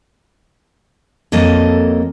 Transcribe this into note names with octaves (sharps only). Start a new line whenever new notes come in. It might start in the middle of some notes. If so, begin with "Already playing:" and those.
F2 F#3 A#3 A4 D#5